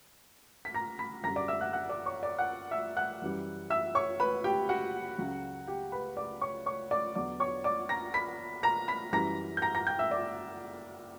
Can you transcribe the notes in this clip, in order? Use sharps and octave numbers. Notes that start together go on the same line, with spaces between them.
B6
A#5 A#6
B5 B6
F#2 D3 G3 A#5 A#6
D5 D6
E5 E6
F#5 F#6
F#5 F#6
D5 D6
C#5 C#6
D5 D6
F#5 F#6
E5 E6
F#5 F#6
F#2 E3 G3
E5 E6
C#5 C#6
B4 B5
G4 G5
F#4 F#5
C#2 C#3 F#3
G4 G5
B4 B5
D5 D6
C#5 C#6
C#5 C#6
D5 D6
E2 D3 F#3 D5 D6
C#5 C#6
D5 D6
A#5 A#6
B5 B6
A#5 A#6
B5 B6
F#2 E3 G3 A#5 A#6
G6
A#5 A#6
A#5 A#6
G5 G6
E5 E6
D5 D6